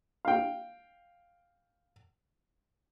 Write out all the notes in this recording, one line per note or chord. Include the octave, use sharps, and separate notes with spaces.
F5 G5